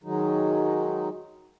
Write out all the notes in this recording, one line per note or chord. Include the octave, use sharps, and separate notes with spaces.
D#3 F#3 G#3 D#4